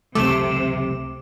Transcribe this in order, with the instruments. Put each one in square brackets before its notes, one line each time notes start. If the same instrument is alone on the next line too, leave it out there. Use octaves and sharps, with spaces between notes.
[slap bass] C#2 E3 F#3 [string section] C3 [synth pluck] A3 [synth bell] D6 E7